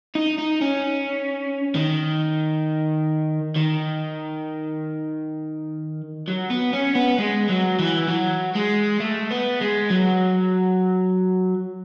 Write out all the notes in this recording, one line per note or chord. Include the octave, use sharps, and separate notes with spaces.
D#4
D#4
C#4
D#3
D#3
F#3
B3
C#4
B3
G#3
F#3
E3
F#3
G#3
A3
B3
G#3
F#3